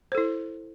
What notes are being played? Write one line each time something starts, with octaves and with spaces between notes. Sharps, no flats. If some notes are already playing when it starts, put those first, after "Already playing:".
E4 A4 C5